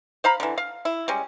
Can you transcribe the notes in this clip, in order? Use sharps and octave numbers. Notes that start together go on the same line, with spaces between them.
C5 F5 A#5 B5
D3 E3
F5
E4
G3 G#3 C#4